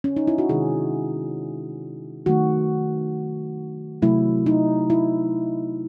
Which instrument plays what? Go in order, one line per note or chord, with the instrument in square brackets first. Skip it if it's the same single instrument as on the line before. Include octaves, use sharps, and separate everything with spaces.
[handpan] C#4
D#4
E4
F#4
C3 D#3 G#3 G#4
D#3 F#3 A3 F#4
C3 F#3 A3 E4
D#4
E4